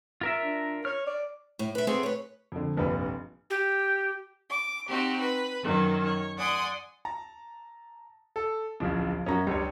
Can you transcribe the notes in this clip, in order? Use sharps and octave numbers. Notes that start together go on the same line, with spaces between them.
F4 A#4 E5
D4
C#5 F6
D5
A2
B4 E5
A3 B3 C4 G#4
B4 C#5
F2 D3
F1 A#1 G2 B4
G4
D6
C4 D#4 F#4 G4
B4
F#2 D#3 F#3
C#5
D5 F#5 G#5 C6 D#6
A5 A#5
A4
D1 A#1 C#3 F3
F#2 C#4 F#4 A#5
C#2 G3 D4 C#5